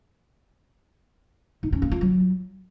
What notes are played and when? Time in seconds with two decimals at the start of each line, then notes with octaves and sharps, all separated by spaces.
1.63 D#4
1.72 C#4
1.82 A#3
1.92 F4
2.01 F#3